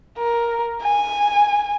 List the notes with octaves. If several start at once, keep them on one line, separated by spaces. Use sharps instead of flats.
A#4
G#5